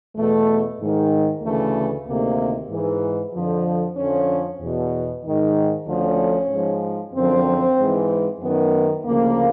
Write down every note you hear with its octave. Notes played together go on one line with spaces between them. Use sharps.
E2 B2 A3
G#2 D#3
D2 C#3 E3 A3
D2 C3 D#3 A#3
G#2 E3
F2 D3 F3
F2 D3 F3 C#4
E2 B2
G#2 D#3
D2 D3 F3 C#4
G#2 F3
F#2 D3 F3 C4
G#2 E3
F#2 D#3 B3
D2 C#3 F3 A#3